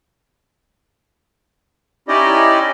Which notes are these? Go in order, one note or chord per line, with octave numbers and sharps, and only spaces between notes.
C#4 D#4 E4 G4 D5 D#5